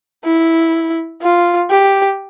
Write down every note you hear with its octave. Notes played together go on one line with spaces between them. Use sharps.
E4
F4
G4